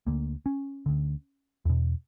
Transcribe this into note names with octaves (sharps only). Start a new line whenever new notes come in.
D2 D3 A#3
C#4
D2 D3
E2 B2